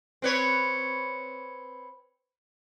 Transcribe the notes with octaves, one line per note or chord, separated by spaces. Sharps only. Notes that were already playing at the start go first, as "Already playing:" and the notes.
C4 B4 C#5